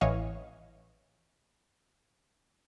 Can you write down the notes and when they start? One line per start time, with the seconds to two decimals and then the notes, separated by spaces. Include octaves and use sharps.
0.01 A1 E3 C#5 D#5 F5